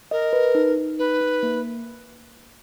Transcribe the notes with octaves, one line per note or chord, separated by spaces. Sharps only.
A#4 D#5
B4
D#4
D#4
D#4 B4
D#4
A#3